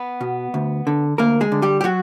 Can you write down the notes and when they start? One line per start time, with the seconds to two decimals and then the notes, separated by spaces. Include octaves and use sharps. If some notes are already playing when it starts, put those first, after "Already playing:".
Already playing: B3 B4
0.21 B2
0.54 D2
0.87 D3
1.18 D2 A#3 A#4
1.41 G#3 G#4
1.52 D3
1.62 G3 G4
1.81 G4
1.84 F#3 F#4